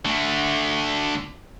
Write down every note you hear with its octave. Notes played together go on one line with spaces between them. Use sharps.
D3 A3